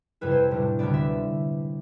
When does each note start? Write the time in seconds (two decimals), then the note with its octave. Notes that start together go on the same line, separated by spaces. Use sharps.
0.21 F2 C3 G3 C4 E4 B4
0.31 C5
0.51 A2 G3 D4
0.79 D2 D3 G3 B3 E4 D5
0.94 E5